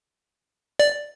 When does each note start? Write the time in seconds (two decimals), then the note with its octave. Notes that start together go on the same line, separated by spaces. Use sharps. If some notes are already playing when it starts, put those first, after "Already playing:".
0.79 D5